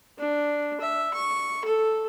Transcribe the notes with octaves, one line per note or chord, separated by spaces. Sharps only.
D4
E5
C#6
A4